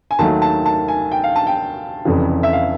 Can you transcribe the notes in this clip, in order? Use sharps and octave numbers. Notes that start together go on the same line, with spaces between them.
G#5
D#2 D#3 F#3 A3 A5
A5
A5
G#5
G5
F5
A5
G5
F1 F2 C#3 E3
E5
F5